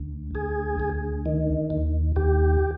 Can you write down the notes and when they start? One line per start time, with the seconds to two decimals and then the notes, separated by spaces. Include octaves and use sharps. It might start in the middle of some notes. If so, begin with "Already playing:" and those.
Already playing: D2
0.35 D2 G#4
0.80 D2
1.26 D#3
1.70 D#2
2.16 D#2 G4